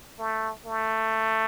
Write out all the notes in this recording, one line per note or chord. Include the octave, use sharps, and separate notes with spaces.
A3
A3